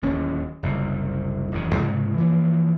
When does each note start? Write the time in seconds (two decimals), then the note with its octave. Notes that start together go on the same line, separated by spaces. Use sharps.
0.02 D1 D#2 C#4
0.63 F#1 C2
1.52 E1 F#2 D#3
1.76 C2 G#2 C#3
2.18 E3 F3 A#3